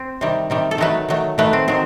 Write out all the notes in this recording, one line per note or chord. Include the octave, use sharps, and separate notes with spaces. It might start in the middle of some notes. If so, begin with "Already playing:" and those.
Already playing: C4
C3 D#3 G3
C3 D#3 G3
A4
D#3 F#3 A3 B4
D#3 F#3 A3
D#3 F#3 A3 B4
C4
D#3 F#3 C4